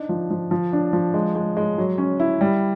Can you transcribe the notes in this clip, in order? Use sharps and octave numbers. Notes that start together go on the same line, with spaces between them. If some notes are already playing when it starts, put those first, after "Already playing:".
Already playing: D4 D#4
F3
F3
F3
D4
F3
G#3
G#3
G#3
F#3
C#4
E4
G3